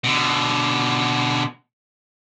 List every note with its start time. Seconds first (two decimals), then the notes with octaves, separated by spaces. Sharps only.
0.04 B2 D3